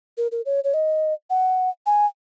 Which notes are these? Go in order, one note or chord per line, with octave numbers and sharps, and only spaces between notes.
A#4
A#4
C#5
C#5
D#5
F#5
G#5